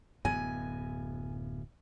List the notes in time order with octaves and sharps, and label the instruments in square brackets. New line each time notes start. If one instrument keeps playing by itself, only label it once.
[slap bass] D1 F#2 B3 [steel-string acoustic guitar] G#5